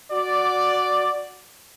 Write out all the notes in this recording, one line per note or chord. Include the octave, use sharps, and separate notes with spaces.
F#4 D5